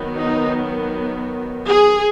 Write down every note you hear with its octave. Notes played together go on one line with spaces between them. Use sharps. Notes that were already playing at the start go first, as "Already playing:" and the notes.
Already playing: D#3 F#3 B3
D#4
G#4